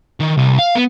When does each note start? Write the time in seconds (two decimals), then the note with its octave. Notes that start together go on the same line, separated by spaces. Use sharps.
0.20 D#3
0.37 C2
0.59 F5
0.75 B3